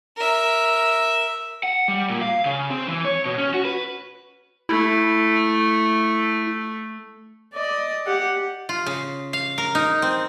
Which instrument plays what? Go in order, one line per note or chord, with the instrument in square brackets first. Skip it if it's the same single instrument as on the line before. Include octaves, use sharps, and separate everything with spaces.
[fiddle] A#4 E5
[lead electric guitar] F#5
G3
A#2
F5
C#3
C4
E3
C#5
B2
C#4
F#4
B4
[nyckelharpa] A3 [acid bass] E4
[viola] D5 D#5
G4 F#5
[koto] F4
C#3
F5
A#4
D#4
C4